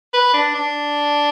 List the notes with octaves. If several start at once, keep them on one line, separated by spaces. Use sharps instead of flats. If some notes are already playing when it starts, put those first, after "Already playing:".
B4
D4
D4